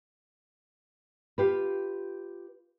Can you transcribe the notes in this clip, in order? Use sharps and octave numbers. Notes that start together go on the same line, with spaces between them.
F4 G4 B4